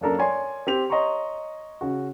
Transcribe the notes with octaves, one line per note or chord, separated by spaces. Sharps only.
F#2 A#3 D4 A4 A#4
C#5 D5 G#5 C6
C4 G4 F7
C#5 D#5 A#5 C6 C#6
C#3 F#4